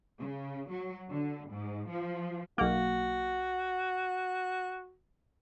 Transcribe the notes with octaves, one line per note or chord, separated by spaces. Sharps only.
C#3
F#3
D3
G#2
F3
B1 A#3 F#4